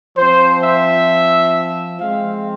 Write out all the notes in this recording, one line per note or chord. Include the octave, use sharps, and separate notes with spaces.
F3 C4 C5
E5
F3 G#3 C4 F5